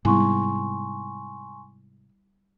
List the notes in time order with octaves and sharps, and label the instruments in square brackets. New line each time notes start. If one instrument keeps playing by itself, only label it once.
[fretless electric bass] G#2 C3 [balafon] G3 B3 E4 [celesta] G#5 C6 C#6